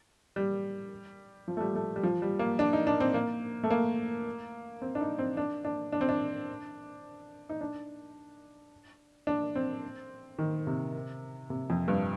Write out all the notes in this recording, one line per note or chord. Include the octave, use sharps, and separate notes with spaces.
G3
F3
A3
G3
A3
G3
F3
G3
A#3
D4
D#4
D4
C4
A#3
A3
A#3
C4
D4
D#4
C4
D4
D4
D4
C4
D4
D#4
D4
D4
C4
D#3
C3
C3
F2
G2